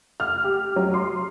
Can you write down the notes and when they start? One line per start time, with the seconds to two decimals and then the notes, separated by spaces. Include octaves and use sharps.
0.20 F6
0.44 G4
0.76 F#3
0.94 C6